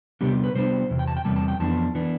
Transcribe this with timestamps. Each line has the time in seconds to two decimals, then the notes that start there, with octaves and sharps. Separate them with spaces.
0.21 C3 G3 B3 D4 G4
0.44 B4
0.55 C3 G3 B3 D4 C5
0.90 E2 C3
0.99 G5
1.07 A5
1.17 G5
1.25 E2 C3 G3 A5
1.36 A5
1.48 G5
1.60 F2 E3 B3 D4 A5
1.95 E3 B3 D4